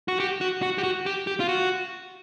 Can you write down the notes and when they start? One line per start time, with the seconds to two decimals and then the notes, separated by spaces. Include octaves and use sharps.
0.08 F#4
0.20 G4
0.41 F#4
0.62 F#4
0.78 G4
0.84 F#4
1.06 G4
1.27 G4
1.40 F4
1.48 F#4